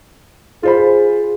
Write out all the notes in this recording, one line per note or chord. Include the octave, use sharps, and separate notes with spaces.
F4 G#4 C5 B5